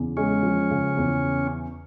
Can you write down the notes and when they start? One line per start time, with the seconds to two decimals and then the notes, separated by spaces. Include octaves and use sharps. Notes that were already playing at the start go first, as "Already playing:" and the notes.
Already playing: E2 C#3
0.17 G#3 C#4
0.43 F3
0.71 C#3
0.97 E2